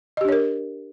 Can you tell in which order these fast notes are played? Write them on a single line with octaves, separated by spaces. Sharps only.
D#5 G4 D4 C#5 A#4